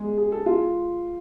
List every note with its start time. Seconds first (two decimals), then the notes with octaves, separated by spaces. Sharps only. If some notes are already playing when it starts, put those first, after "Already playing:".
Already playing: G#3 G#4
0.18 G#4
0.32 A4
0.46 F4